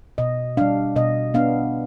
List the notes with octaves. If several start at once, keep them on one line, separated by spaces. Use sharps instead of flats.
B2 D#5
G3 D4 F5
B2 D#5
B3 D4 F5